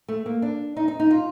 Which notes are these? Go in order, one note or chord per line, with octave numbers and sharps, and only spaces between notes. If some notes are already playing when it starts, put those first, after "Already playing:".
A3
A#3
D4
D#4
D#4
D#4
F4